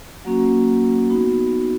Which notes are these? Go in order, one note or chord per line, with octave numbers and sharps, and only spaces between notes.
F#3 A#3 C#4 F#4
B3 D#4 F#4